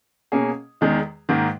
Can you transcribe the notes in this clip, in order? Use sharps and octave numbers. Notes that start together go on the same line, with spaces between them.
B2 A#3 C#4 G#4
E2 D#3 G#3 D#4
G#2 D#3 A#3